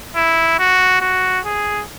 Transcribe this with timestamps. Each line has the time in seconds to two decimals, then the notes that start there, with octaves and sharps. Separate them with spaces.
0.16 E4
0.59 F#4
1.01 F#4
1.45 G#4